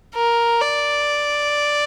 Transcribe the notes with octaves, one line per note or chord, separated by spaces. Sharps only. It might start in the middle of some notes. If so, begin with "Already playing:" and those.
A#4
D5